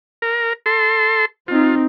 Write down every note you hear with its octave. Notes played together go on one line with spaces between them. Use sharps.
A#4
A4 C6
C4 D#4 F4